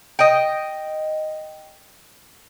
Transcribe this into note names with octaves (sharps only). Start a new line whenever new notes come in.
D#5 G5